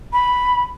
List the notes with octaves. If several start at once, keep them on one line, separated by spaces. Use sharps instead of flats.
B5